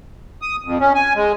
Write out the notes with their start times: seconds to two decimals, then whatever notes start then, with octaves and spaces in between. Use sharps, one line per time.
0.42 D#6
0.65 F2
0.80 C#4
0.95 G#5
1.15 G#3